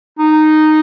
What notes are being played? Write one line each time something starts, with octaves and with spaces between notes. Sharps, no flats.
D#4